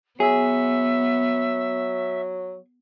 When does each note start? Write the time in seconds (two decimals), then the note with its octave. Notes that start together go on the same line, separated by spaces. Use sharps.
0.20 F#3 B3 G#4 E5